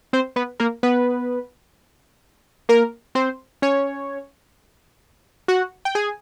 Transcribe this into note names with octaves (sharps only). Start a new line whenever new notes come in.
C4 C5
B3 B4
A#3 A#4
B3 B4
A#3 A#4
C4 C5
C#4 C#5
F#4 F#5
G5
G#4 G#5